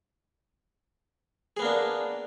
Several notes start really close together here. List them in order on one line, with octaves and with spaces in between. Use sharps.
G#4 B3 A#3 D4